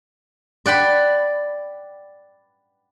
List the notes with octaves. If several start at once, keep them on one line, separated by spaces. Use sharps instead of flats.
D5 F#5 G5 B5